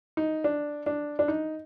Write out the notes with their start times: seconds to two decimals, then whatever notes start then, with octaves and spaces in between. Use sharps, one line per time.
0.17 D#4
0.44 D4
0.86 D4
1.19 D4
1.28 D#4